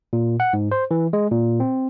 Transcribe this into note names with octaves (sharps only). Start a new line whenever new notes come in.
A#2
F#5
G#2
C5
E3
G#3
A#2
C4